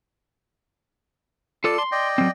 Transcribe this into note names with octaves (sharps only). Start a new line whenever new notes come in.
F4 A4 D5 A5
C6
D5 D#5 G5
F#3 C4